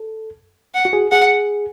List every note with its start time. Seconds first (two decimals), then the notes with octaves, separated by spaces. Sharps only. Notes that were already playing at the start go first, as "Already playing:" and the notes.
Already playing: A4
0.74 F#5
0.85 F#4
0.93 G#4
1.11 G#4 F#5